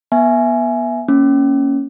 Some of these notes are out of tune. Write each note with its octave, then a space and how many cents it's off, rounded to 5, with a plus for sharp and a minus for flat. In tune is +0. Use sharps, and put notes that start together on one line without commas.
B3 -30 E5 +10 G#5 +10
A#3 +0 C#4 +0